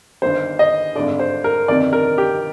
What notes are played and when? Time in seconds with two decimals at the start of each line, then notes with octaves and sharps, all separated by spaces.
0.22 G1 G2 D#3 C5
0.59 D#5
0.95 G#1 G2 D3 D5
1.20 C5
1.44 A#4
1.68 G1 F2 C3 D#3 D5
1.93 A#4
2.18 G4